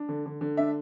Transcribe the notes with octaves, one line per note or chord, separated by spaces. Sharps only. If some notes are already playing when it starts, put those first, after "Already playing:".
Already playing: D4
D3
D3
D3
D4 E5